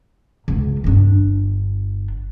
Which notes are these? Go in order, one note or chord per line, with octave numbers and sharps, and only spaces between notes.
C#2
G1 D4